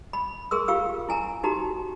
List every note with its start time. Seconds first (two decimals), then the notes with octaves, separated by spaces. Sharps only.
0.13 B5
0.51 G#4 A#4 C6 E6
0.68 F4 G4 F5 E6
1.09 E4 G#5 A#5
1.43 D#4 F#4 G4 A#5